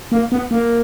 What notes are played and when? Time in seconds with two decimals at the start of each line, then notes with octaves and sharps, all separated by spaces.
0.12 A#3
0.32 B3
0.51 A#3